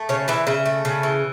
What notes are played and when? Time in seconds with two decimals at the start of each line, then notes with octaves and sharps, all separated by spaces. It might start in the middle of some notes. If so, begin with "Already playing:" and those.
Already playing: A3
0.09 C#3 C#5
0.28 E3 E5
0.47 C#3 E5
0.66 A3
0.85 C#3
1.03 E3